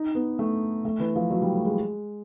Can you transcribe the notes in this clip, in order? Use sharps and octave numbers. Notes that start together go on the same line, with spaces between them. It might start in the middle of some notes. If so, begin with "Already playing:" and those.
Already playing: D#4
B3
A3
A3
E3
F3
F#3
G3
A3
G#3